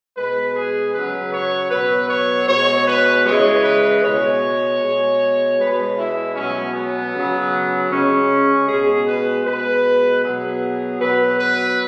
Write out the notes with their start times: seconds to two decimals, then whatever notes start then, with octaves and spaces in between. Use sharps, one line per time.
0.15 B2 G#3 B4
0.54 G#4
0.93 C#3 F#3 B4
1.32 C#5
1.70 B2 F#3 B4
2.09 C#5
2.47 B2 G#3 C#5
2.87 B4
3.25 C#3 E3 G#3 C#5
3.63 B4
4.02 B2 G#3 C#5
4.81 B2 G#3
5.57 B2 G#3 B4
5.96 E4
6.35 B2 F#3 C#4
6.74 B3
7.13 C#3 F#3
7.89 C#3 G#3 C#4
8.67 B2 G#3 G#4
9.06 B4
9.44 B2 G#3 B4
10.23 B2 F#3 G#4
11.00 B2 F#3 B4
11.39 B4